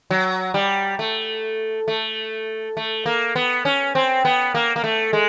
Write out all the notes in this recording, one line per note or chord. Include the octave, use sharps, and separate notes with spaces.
F#3
G3
A3
A3
A3
A#3
B3
C#4
C4
B3
A#3
A#3
A3
G#3